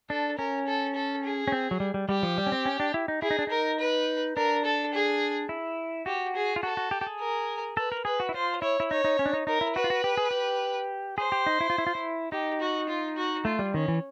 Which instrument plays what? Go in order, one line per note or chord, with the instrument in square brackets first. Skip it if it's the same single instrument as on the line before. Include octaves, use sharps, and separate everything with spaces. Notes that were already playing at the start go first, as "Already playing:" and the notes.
[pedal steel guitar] D4 [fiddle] A4
[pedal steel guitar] C#4 [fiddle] A#4
[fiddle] A4
A4
G#4
[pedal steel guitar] C#4
C4
F#3
G3
G3
[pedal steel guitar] G3 [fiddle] G4
[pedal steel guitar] F3
G3
C#4
C4
C#4
D4
E4
D#4
[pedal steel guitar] E4 [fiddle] G#4
[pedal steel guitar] D#4
D4
[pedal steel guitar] D#4 [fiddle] A#4
[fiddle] B4
[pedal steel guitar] D4 [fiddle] A#4
[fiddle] A4
G#4
[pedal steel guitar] E4
[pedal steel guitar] F#4 [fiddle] G4
[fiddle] G#4
[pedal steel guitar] F4
[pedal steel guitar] F#4 [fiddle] A4
[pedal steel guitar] F#4
G4
G4
G#4
[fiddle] A#4
[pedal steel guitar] A4 [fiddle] B4
[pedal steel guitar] A#4
[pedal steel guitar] G#4 [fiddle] B4
[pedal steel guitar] F#4
E4
[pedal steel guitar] F4 [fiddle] C5
[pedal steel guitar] E4 [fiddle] C#5
[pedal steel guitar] E4
[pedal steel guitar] D#4 [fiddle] C#5
[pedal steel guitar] D#4
C#4
D4
D#4
[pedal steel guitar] D#4 [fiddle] A#4
[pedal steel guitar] E4
[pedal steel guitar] F#4 [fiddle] B4
[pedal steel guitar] F4
F#4
G4
G#4
G4
[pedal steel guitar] G#4 [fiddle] C5
[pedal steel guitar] G4
D#4
E4
F4
E4
F4
E4
[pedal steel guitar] D#4 [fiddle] G4
[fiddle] F#4
F4
F#4
[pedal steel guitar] A3 [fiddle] F4
[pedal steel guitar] G3
[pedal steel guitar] D#3 [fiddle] C#4
[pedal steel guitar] E3